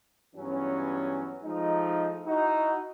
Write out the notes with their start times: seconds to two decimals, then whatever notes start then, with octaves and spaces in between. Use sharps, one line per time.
0.36 G2 E3 F#3 B3 C#4
1.44 F3 G#3 A3 D#4
2.27 D#4 E4 F#4